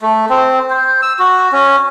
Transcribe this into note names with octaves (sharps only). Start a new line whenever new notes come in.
A3
C4
C5
E6
F#4
C#4